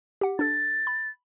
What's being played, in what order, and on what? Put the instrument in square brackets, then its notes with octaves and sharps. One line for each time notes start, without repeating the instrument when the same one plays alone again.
[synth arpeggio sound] G4 F#5
[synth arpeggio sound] D4 A4 [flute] A6
[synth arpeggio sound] B5